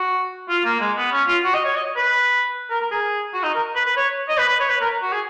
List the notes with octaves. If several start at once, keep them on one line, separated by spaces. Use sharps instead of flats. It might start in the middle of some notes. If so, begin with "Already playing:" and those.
Already playing: F#4
F4
A#3
G#3
B3
C#4
F4
F#4
D#5
C#5
D#5
B4
A#4
A#4
G#4
F#4
D#4
A#4
B4
B4
C#5
D#5
B4
B4
C#5
B4
A#4
F#4
G#4